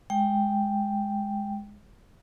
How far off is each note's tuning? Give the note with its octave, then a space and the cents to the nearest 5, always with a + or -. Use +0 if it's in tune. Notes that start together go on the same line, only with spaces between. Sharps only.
G#3 +0 G5 +0